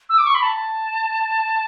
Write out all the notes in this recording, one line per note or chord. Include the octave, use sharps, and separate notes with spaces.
E6
D6
C#6
B5
A5